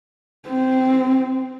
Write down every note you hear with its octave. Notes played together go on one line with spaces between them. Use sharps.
C4